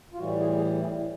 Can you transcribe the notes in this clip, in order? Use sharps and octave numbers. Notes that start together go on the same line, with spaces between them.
F4
A2 E3 G3 F#4
G#4
G#4